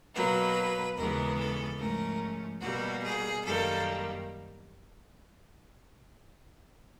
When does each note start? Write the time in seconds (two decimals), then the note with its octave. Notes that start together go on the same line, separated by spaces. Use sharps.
0.14 B2 F#3 A#3 B4
0.96 D#2 C#3 E3 G#3 B3 A#4
1.38 A4
1.78 G#2 F3 A3 C#4 A#4
2.61 B2 G3 A#3 F#4
3.02 G#4
3.44 F#2 D#3 G3 A#3 A4